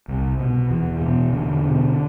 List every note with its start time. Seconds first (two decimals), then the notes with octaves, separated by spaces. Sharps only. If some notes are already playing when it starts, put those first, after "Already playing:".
0.08 C2
0.39 B2
0.71 E2 E3
1.01 B2
1.32 E2 D3
1.64 B2